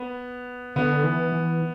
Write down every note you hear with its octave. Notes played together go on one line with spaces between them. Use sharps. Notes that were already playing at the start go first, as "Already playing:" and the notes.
Already playing: B3
D3 B3
E3
E3